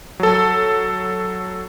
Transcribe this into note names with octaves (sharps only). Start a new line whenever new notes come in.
F#3 A4